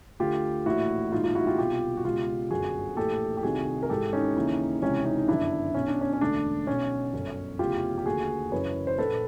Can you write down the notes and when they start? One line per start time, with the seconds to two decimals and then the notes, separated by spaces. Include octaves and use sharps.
0.20 D2 D3 F4 G4
0.66 A#1 A2 E3 E4 F#4
1.12 A#1 G#2 D#3 D#4 F4
1.23 D#4 F4
1.35 E4 F#4
1.47 F4 G4
1.58 C2 B2 F4 G4
1.97 F#4
2.04 C#2 B2 F4 G4
2.50 G1 F#2 D3 F#4 G#4
2.97 A#1 A2 E3 G4 A4
3.37 G4
3.43 C2 C3 D#3 F#4 G#4
3.83 A#4
3.90 G#1 G#2 E3 G4 A4
4.13 C#4 D#4
4.36 D#2 C#3 E3
4.82 C#2 C3 E3 C#4
5.05 C#4 D#4
5.18 D#4
5.28 G1 F#2 D#3 D4 E4
5.74 B1 B2 C#4
5.88 D4
6.01 C#4
6.13 C#4
6.21 E1 D2 D3 D4
6.67 B1 B2 C#4
7.13 G1 F#2 D3
7.59 F1 E2 C#3 E3 F4 G4
7.98 G4
8.05 D#2 D3 F#4 G#4
8.52 F#1 F#2 C#3 E3 B4 C#5
8.87 C5
8.98 A#1 A#2 A4 B4